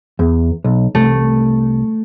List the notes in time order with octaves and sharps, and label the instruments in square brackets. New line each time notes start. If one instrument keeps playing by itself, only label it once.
[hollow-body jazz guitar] E2
B1
[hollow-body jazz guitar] C2 [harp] A3